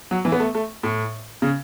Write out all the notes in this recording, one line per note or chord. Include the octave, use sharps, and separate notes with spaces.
F#3
E3
B3
A3
A3
A2
C#3